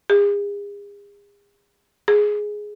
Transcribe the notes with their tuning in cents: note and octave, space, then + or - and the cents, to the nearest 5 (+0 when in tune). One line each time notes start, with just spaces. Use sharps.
G#4 -40
G#4 +5